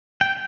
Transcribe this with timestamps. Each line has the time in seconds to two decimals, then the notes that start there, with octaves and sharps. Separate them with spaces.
0.21 G5